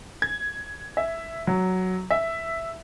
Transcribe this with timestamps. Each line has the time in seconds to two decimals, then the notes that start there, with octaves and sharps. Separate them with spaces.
0.22 G#6
0.97 E5
1.47 F#3
2.10 E5